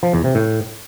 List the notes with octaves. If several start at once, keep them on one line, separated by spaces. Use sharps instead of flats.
F3
E2
C3
A2